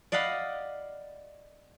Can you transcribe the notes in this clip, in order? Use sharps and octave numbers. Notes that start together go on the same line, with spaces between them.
D5 D#5 F5 F#5 B5